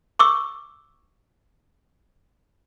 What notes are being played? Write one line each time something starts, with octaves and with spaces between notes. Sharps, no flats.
C#6 D6 E6